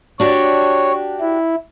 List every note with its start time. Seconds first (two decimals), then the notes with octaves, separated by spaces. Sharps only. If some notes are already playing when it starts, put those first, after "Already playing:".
0.20 D4 F#4 G4 C#5
1.20 E4